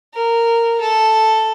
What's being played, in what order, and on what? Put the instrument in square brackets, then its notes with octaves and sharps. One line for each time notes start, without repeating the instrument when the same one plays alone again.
[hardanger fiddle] A#4
A4